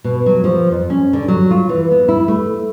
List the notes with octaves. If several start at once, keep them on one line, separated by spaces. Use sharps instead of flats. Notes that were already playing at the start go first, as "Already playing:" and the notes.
B2
F#3
F3
F2
C#4
D3
F#3
F4
E3
B3
E4
A3